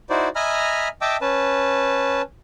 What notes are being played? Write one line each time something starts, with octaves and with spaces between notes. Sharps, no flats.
D#4 E4 F#4 C5 D5
D#5 E5 G#5 A#5 B5 F6
D#5 E5 G5 A5 D6 E6
C#4 B4 A5